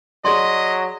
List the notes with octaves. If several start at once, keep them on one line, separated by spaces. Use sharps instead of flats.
F#3 G#4 D5 D#5 C6